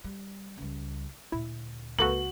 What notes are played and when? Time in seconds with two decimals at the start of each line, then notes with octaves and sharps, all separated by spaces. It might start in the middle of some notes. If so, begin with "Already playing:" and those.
0.04 G3
0.58 C#2 G3
1.32 D2 A#2 E4
1.99 C#2 A#3 F#4 A4 B4 F#7